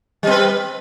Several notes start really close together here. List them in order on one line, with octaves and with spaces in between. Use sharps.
G3 C4 B4